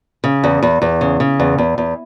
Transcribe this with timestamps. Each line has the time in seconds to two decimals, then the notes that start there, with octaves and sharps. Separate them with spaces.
0.24 C#3
0.44 E2
0.62 E2
0.82 E2
1.01 C#3
1.20 C#3
1.40 E2
1.58 E2
1.78 E2